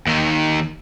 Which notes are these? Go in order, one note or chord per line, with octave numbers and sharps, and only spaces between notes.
D#2 D#3